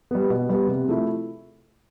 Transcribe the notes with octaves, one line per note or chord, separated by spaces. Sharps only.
G3 B3
B2
G3 B3
C3
F3 A3 E4